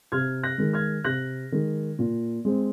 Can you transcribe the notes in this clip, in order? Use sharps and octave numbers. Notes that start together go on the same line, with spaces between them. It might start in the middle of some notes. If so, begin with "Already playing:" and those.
C3 F6 G#6
F#6 A#6
D#3 G#3
F6 G#6
C3 F#6 A#6
D#3 G#3
A#2
G#3 C4